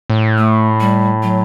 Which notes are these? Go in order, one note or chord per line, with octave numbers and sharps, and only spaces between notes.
A2
A3
G3
F#3